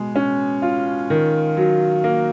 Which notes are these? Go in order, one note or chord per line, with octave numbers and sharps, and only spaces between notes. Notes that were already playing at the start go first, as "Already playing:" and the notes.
Already playing: B2 G#3
C#4
F4
D#3
F#3
A#3